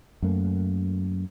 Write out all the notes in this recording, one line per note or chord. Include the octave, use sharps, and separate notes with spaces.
F#2 A3 A#3